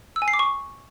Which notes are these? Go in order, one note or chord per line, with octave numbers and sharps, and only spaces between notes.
E6
G#5
C7
D6
C#6